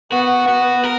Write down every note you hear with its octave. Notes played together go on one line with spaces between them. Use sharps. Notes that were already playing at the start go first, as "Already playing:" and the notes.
B3 F#4
B3 F#4
A#4